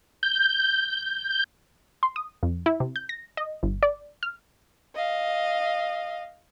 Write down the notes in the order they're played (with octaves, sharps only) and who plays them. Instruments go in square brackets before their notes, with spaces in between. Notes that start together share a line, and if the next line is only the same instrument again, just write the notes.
[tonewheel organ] G6
[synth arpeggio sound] C6
D#6
F2
E4
C3
G6
A#6
D#5
G1
D5
F6
[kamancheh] D#5 F5